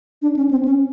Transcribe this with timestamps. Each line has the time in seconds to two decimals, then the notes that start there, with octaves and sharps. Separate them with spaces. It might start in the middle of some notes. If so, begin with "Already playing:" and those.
0.22 D4
0.36 C#4
0.51 C4
0.65 C#4